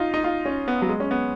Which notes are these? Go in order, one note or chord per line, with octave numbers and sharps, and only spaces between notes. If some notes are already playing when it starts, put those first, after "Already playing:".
Already playing: D#4 F4
D#4
F4
C#4
B3
F#3
G#3
C#4
B3